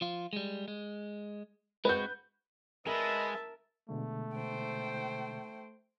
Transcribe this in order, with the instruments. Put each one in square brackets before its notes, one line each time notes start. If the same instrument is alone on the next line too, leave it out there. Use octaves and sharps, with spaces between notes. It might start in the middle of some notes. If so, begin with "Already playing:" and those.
[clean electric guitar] F3 F4
G3 G#3
G#3
[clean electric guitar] G#3 C4 F#4 [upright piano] B4 G6
[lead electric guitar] G#3 [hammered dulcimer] A#4 [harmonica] B4 D#5 [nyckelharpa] E5 A5
[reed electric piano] B2 D3 G#3 [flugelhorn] A3
[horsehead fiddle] C5 G5